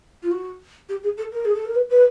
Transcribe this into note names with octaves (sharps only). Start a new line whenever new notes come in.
F4
F#4
G4
G#4
A4
A#4
G#4
A4
A#4
B4
B4